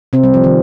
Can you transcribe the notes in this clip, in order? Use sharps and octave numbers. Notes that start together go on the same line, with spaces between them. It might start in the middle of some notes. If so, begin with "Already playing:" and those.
C3 C4
G3
F3
D#3